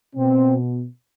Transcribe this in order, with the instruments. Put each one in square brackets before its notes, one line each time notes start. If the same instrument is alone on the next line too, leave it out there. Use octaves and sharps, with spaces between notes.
[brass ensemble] B2 C4